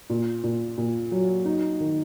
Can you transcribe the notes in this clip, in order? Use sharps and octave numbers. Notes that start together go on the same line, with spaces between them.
A#2
A#2
A#2
F#3
D#4
D#3